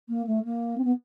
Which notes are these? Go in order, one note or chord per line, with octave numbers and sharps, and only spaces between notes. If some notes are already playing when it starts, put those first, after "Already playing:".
A#3
A3
A#3
C4
B3